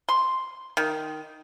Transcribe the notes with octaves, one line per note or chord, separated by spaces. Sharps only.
C6
D#3